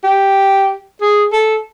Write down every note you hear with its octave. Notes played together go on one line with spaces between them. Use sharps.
G4
G#4
A4